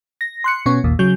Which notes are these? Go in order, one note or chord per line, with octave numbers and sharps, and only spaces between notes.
A#6
C6 F#6 C#7
B2 B3 C#4 C#6
G#1 D#2 A#2
C#3 F#3 G6